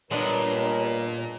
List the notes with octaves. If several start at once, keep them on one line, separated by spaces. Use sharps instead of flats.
G2 A#2 G#3 B3 D4 A#4 C#5